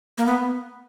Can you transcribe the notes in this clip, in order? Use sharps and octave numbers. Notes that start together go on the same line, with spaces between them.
A#3
B3